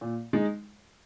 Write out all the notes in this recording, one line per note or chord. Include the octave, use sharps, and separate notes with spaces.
A#2
G#3 D#4